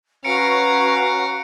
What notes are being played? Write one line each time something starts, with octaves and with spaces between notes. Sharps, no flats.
C#4 F#4 B4 F5 A#5 C#7 D7